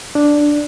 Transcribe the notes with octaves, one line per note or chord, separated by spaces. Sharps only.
D4